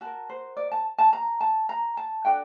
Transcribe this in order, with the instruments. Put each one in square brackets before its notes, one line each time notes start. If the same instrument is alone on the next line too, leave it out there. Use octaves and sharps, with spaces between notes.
[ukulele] F#4 A#4 A5
C5
D5
A5
A5
A#5
A5
A#5
A5
D4 F#4 A4 G5